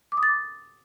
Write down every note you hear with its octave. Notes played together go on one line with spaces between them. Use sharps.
D6
D#6
A6
D6